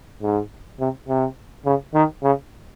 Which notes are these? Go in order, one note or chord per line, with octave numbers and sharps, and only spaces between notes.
G#2
C3
C3
C#3
D#3
C#3